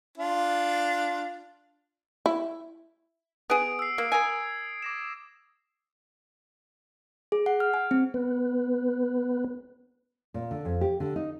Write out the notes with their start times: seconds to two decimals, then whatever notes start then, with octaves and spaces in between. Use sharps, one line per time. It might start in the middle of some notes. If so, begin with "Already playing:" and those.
0.18 D4 F4
2.26 E4
3.50 B3 G#4 D#6 D7
3.79 E6 C7
3.98 A#3
4.12 A#4 G#5 D#6 E6 G#6
4.82 D6 A#6 E7
7.32 G#4
7.46 F#5
7.60 F6
7.74 G#5
7.91 C4
8.14 B3 B4
10.34 A#2
10.51 D3
10.65 F2
10.81 G4
11.00 D3
11.16 D#4